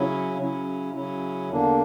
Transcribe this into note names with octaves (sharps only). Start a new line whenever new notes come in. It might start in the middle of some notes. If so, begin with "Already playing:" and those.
Already playing: C#3 F#3 C#4 E4
C#3 F#3 C#4 E4
C#3 F#3 C#4 E4
E2 D3 A#3 D4